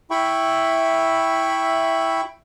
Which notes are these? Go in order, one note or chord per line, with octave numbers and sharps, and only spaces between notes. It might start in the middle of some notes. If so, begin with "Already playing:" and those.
E4 E5 G5 B5 C#6